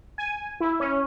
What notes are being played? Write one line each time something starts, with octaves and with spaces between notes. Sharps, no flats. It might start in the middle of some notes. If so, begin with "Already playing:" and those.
G#5
E4
C#4